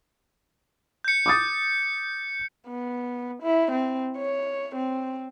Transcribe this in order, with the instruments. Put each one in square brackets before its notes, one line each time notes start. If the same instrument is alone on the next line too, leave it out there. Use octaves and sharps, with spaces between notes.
[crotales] G6 C#7
[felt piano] D6 D#6 A6
[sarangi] B3
E4
C4
C#5
C4